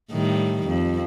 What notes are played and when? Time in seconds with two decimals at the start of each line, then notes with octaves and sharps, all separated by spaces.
0.12 A2 D#3 G3
0.67 F2